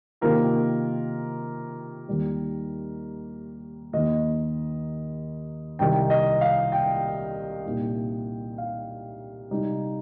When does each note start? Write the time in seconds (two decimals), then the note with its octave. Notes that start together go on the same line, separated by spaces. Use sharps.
0.21 C3 D#3 A#3 F4 A#4
2.08 D#2 D#3 G3 D#4
3.93 D#2 D#3 A#3 D#4 D#5
5.79 C2 C3 D#3 G3 D#4 G5
6.10 D#5
6.41 F5
6.72 G5
7.65 C2 A#2 A#3 D#4
8.58 F5
9.51 C3 G3 D#4